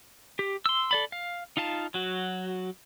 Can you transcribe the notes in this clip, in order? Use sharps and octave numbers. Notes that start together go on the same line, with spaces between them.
G4
C6 E6
A4 D5 B5
F5
D#4 F4 F5 A5
F#3 F#4